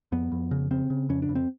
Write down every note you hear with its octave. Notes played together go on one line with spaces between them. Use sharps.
F2 B3
F2
C#3
C#3 C4
C#3
F2 C#4
D4
F2
C4